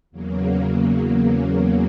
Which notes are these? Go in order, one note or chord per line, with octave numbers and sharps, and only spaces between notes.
E2 C#3 F#3 A#3